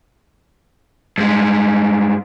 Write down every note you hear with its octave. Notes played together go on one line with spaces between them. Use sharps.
G2 G#3